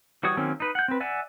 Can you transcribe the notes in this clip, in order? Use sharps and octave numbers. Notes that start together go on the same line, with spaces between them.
E3 G3 F#4 C#5 D#6
D#3 F#3 A#3 C4 C#4
D#4 B4
F#5 G6
C4 B4
D5 E5 F#5 G#5